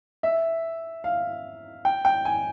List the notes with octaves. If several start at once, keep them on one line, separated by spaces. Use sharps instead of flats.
E5
F5
G5
G5
G#5